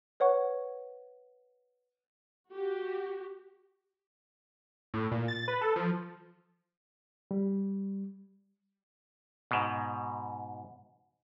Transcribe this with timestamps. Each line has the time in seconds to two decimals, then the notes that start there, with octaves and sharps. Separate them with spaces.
0.20 B4 C#5 F#5 C#6
2.51 F#4 G4
4.94 A2
5.12 A#2
5.28 A6
5.48 B4
5.61 A4
5.76 F3
7.31 G3
9.51 G#2 B2